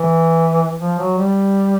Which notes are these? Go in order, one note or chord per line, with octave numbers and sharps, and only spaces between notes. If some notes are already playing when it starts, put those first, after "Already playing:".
Already playing: E3
F3
F#3
G3